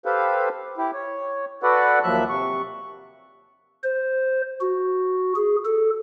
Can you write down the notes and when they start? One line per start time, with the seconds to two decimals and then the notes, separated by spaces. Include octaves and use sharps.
0.05 G4 A4 B4 C5 F5
0.77 E4 G4
0.94 C#5
1.63 F#4 A4 B4 D5 F#5
2.03 D#2 F3 F#3 E5 F#6
2.29 C3 C#6
3.84 C5
4.61 F#4
5.36 G#4
5.65 A4